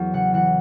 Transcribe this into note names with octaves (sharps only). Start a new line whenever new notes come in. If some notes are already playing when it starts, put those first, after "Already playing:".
Already playing: E2 F#3 G#4
C#3 F#5
E3 F#5